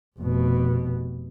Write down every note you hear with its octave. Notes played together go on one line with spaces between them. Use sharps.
F1 B2